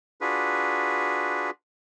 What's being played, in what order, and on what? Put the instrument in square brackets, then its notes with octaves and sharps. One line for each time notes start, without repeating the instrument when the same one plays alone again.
[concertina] D4 F4 F#4 G#4 B4